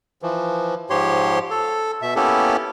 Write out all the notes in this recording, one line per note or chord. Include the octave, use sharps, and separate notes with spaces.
E3 F3
G#2 F3 G4 C#5 C6
A4
B2 E5
A#3 B3 C#4 E4 G4 A4